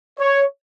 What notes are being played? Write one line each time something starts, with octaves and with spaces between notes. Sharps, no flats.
C#5